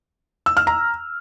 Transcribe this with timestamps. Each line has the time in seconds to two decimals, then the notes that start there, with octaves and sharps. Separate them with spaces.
0.46 E6
0.57 F6
0.67 A#5